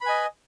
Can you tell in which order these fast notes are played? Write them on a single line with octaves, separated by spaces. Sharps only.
B5 B4 G#5 D#5